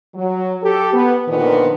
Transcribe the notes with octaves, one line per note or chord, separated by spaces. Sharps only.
F#3
G4 A4
B3
A#2 D3 D#3 F3 B3